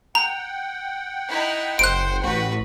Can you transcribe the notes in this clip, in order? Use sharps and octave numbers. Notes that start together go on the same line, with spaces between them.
F#5 G5 A#5
D#4 E4
F#1 C5 F#6 D7
A1 F#4 B4